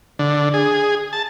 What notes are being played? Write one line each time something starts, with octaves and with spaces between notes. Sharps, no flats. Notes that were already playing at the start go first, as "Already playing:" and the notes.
D3
G#4
A5